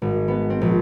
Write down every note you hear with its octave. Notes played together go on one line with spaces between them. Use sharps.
G#1
B3
C4
A#1